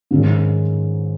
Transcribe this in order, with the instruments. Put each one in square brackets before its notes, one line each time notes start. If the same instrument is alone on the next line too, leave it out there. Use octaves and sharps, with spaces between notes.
[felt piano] G#2 D#3 G#3 C#4